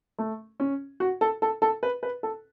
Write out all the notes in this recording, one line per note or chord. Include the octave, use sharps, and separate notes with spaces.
A3
C#4
F#4
A4
A4
A4
B4
B4
A4